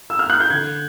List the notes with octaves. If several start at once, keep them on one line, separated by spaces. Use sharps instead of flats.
E6
F6
F#6
G6
D3 G#6